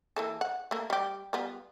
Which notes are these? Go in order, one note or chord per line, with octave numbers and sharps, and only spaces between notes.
E3 A#3 A4
F#5
A3 A#3
G3 G4
G3 B3 F4